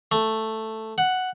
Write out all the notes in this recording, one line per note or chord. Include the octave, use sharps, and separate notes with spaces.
A3
F#5